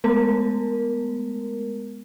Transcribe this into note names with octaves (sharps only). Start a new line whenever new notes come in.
G#3 A3 B3 A#4